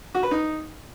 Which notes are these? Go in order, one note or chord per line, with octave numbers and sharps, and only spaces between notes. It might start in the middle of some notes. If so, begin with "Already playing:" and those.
F#4
B4
D#4